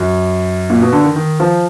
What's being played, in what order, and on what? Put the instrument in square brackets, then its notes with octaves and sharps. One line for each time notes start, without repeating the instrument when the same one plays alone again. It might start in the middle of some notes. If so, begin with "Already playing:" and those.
Already playing: [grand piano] F#2
A#2
B2
D3
D#3
D#3
F3